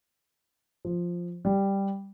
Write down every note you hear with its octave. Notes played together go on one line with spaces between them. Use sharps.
F3
G3